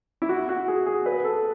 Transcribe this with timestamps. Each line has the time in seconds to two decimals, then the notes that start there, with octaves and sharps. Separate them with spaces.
0.22 E4
0.29 F#4
0.49 F#4
0.68 G#4
0.86 G#4
1.06 B4
1.24 A4